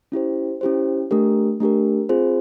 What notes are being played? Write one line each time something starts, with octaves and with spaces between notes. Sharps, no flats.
C#4 E4 G4 C5
C#4 E4 G4 C5
A3 D4 G4 A#4
A3 D4 G4 A#4
C4 F4 G#4 C5